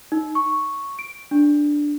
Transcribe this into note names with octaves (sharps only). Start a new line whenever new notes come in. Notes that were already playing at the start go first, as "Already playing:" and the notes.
D#4
C#6
D7
D4